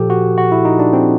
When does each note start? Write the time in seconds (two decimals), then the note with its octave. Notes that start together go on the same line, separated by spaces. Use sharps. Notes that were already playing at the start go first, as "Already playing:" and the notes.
Already playing: A#2 F3 G4 A4
0.10 F#4
0.38 F#4
0.52 E4
0.65 D#4
0.79 D4
0.93 C4